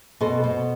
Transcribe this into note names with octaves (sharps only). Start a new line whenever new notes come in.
B2 A4 C5
B2